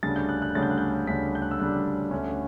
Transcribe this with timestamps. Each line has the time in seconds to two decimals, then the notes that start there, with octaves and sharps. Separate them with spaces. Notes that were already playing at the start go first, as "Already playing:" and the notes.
0.03 D2 C#3 G3 D4 A6
0.16 G6
0.29 F#6
0.42 F#6
0.55 D2 C#3 G3 D4 A6
0.63 G6
0.70 F#6
0.78 G6
1.07 D2 C#3 G3 D4 B6
1.35 G6
1.42 F#6
1.51 E6
1.60 D2 C#3 G3 D4 F#6
2.11 D2 D3 A3 C#4